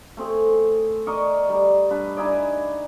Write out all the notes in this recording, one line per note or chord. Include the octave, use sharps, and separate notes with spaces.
A3 C4 G#4
A#4 D5 D#5 C#6
G3 A#4
G2 B4 A5
D#4 E4 G#4 D5